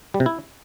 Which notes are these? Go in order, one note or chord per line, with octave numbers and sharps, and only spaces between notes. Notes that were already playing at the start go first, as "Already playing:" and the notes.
G3
C3
E4